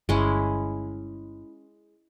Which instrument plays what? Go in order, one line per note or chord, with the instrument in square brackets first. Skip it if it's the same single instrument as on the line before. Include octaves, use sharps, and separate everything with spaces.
[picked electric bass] G1 [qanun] G#3 C#4 E4